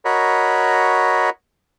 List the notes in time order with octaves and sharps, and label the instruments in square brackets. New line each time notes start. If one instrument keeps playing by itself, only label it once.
[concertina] F#4 A#4 C#5 D#5 B5